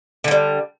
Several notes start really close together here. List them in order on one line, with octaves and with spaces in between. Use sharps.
D3 E3 G3